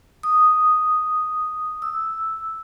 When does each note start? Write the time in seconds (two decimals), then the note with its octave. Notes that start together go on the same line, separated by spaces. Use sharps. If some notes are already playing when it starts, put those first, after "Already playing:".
0.23 D#6
1.82 E6